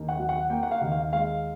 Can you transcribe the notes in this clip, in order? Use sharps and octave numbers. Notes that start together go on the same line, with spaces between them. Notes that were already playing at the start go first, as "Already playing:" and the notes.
Already playing: D#2
F#5
F#3
F#5
A#3 G5
F#5
F5
D#2
F5
G#3 F5